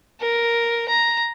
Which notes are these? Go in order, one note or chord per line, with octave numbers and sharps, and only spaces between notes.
A#4
A#5